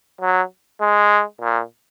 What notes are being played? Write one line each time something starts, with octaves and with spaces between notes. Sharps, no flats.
F#3
G#3
A#2